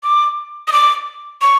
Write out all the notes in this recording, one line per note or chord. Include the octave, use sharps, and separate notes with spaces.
D6
D#6
D6
C#6